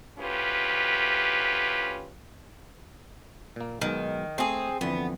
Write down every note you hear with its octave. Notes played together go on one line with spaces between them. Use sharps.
D2 C#4 F4 G4 B4
A#2 A#3
B1 B2 D#3 G#3
A3 C4 G#4
F2 D3 E3 B3